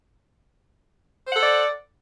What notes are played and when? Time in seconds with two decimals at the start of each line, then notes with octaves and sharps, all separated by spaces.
1.27 C5
1.31 F#5
1.36 A4
1.41 D5